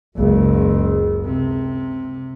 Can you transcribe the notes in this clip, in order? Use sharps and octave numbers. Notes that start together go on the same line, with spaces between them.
F#1 C#2
C3